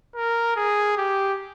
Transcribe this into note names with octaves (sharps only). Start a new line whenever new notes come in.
A#4
G#4
G4